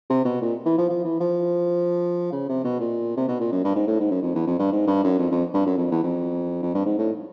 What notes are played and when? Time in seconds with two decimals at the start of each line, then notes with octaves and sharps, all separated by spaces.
0.10 C3
0.25 B2
0.42 A#2
0.66 E3
0.77 F3
0.90 F3
1.04 E3
1.20 F3
2.32 C#3
2.49 C3
2.64 B2
2.80 A#2
3.17 C3
3.28 B2
3.40 A#2
3.52 F#2
3.64 G2
3.75 G#2
3.87 A2
4.00 G#2
4.11 F#2
4.23 F2
4.35 E2
4.47 F2
4.59 G2
4.72 G#2
4.87 G2
5.03 F#2
5.19 F2
5.31 F2
5.54 G2
5.66 F#2
5.78 F2
5.91 E2
6.03 F2
6.62 F2
6.74 G2
6.85 G#2
6.98 A2